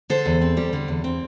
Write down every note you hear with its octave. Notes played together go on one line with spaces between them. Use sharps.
D3 A4 C5
E2
C4
G3
D3
E2
C4